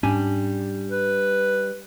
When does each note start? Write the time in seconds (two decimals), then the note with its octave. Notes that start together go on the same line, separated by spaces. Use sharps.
0.03 G#2 G3 C#4 D4 G#5
0.90 B4